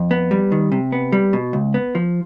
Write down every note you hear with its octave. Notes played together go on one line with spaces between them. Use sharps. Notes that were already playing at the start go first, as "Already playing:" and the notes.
Already playing: F2
B3
G3
D#3
C3
B3
G3
B2
C#2
B3
F3